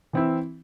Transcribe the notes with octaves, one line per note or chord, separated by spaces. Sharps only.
E3 C4 E4